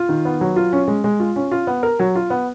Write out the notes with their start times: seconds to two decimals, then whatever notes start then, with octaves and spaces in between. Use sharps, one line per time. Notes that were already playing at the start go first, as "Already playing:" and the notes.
Already playing: F4
0.09 D#3
0.25 B3
0.41 F#3
0.56 F4
0.73 C#4
0.88 G#3
1.04 G#3
1.20 F4
1.36 C#4
1.51 F4
1.67 B3
1.83 A#4
1.99 F#3
2.15 F4
2.30 B3